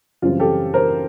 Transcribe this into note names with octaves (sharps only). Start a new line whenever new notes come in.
F#2 C#3 E3 G3 C4 F4
G4 A4
A#4 C5